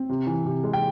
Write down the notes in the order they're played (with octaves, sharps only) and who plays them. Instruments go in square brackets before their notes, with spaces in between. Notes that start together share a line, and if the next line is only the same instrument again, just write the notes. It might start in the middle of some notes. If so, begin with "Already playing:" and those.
Already playing: [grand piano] C4
C3
E3
C3
G#3
G5